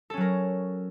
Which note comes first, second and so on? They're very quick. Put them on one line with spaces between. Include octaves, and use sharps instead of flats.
A4 C#4 F#3 A#4